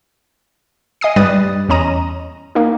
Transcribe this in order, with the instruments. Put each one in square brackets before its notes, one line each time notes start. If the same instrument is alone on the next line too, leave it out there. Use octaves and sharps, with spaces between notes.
[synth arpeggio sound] D#5 G#5 D#6 C7
G2 G3 B4 D#6 F#6 A6
E2 C#4 D#5 A#5 D#7
A#3 D#4